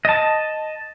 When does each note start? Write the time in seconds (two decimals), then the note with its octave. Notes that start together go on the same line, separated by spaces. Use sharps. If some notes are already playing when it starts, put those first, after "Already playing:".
0.05 D#5 A5